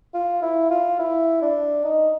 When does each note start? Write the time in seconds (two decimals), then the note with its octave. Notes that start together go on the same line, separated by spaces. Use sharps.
0.14 F4
0.42 E4
0.70 F4
0.99 E4
1.42 D4
1.85 D#4